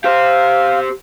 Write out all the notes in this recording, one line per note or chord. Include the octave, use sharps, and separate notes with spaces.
G4 C5 F5